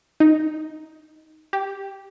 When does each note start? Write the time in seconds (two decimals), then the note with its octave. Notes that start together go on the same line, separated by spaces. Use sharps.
0.20 D#4
1.53 G4